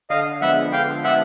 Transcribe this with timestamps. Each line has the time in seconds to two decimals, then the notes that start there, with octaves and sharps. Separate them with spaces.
0.10 D3 D#5 F5
0.41 F3 G#3 B3 E5 F#5
0.72 D3 F5 G5
1.03 F3 G#3 B3 E5 F#5